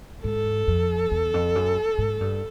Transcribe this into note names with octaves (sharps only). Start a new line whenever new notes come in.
G#2 A4
F2
E2
F2
F#2
G#2
G2